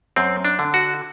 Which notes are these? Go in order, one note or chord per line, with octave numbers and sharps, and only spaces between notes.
F#2 C4
D4
D3
F#4